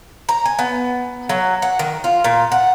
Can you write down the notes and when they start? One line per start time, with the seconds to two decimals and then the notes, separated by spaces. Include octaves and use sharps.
0.29 A#5
0.46 G#5
0.59 B3
1.29 F#3
1.62 F#5
1.79 D#3
2.04 F4
2.24 A#2
2.52 F#5